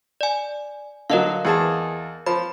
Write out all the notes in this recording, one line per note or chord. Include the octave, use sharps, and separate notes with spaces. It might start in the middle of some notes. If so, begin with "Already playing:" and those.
D5 G#5
D3 F#3 A#4 D#5 F5
E2 G#4 A5
F3 B5